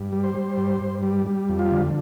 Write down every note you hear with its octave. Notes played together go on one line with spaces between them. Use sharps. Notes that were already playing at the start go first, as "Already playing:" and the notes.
Already playing: G2
G3
C5
G3
G2
G2
G3
G3
F2
F4
D3